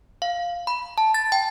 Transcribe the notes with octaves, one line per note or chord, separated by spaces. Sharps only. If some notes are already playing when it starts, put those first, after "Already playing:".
F5
B5
A5
A6
G5